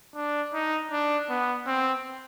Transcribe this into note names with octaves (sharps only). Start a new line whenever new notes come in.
D4
D#4
D4
B3
C4